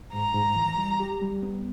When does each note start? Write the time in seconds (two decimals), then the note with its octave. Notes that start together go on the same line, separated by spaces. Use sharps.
0.13 G#2 A#5
0.34 G#2
0.56 E3
0.78 G3
1.00 G4
1.22 G3
1.43 B3